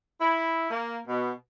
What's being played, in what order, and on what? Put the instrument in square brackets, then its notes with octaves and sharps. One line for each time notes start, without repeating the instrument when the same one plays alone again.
[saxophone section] E4
A#3
B2